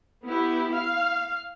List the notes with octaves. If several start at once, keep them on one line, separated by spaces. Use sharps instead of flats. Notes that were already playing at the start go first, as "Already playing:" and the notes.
B3 E4 G4
F5